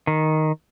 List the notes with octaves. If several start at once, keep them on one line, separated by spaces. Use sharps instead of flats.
D#3